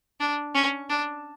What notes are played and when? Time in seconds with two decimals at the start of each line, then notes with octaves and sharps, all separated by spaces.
0.20 D4
0.55 C#4
0.90 D4